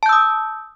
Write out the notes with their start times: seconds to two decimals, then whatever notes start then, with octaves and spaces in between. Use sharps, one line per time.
0.03 A5
0.06 G6
0.09 E6
0.13 D#6